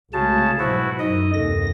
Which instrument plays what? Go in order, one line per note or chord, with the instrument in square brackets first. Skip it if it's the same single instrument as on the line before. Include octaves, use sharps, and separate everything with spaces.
[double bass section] C2 G#3 A3 [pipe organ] C#3 A5 [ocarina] F#4
[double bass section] G#2 B2 F#3 [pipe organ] E4 F#4 [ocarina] C5
[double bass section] F#2 [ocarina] D#4 [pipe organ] D#5
[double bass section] F#1 D#2 C3 [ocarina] A4 [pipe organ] A#6